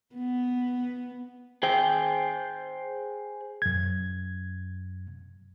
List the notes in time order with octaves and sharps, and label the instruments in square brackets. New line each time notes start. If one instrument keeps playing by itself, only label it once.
[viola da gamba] B3
[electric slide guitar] G#4 C5 G5
[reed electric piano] F#2 G#6